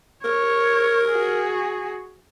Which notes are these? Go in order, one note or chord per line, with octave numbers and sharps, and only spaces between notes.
A#4 C#5
F#4 G#4